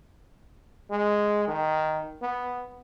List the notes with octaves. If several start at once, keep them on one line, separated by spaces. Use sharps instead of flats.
G#3
D#3
B3